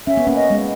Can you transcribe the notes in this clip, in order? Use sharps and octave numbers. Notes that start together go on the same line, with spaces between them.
C#4 E5
B3
A#3 C#4
D#5
G#3 B3